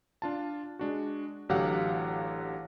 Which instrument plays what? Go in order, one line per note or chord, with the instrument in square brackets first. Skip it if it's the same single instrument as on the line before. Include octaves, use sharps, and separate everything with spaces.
[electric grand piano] D4 F4 A5
G#3 D4 F#4
A1 D3 F#3 G4 F5 F#5